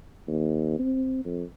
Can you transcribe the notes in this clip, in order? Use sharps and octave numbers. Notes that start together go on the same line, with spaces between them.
D#2
C4
F2